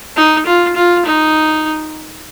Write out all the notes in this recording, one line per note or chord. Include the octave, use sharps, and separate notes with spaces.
D#4
F4
F4
D#4